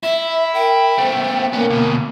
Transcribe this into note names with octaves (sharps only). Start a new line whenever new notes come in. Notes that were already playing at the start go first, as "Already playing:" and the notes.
E4 E5
A#4 G5
A3 B3 C5
A#3 B3 C#4
D2 B2